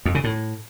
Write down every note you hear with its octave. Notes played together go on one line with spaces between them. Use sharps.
F2
C#3
A2